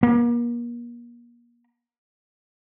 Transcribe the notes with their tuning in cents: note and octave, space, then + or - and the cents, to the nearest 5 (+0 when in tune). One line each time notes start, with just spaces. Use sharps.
A#3 +35